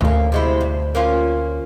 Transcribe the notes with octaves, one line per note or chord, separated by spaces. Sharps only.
D2 A#3 C#4
C3 G#3 E4
G2
A#3 C#4 F4